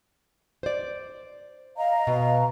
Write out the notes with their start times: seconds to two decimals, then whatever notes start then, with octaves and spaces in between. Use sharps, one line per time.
0.63 C5 D5
1.77 D#5 F5 A#5
2.07 B2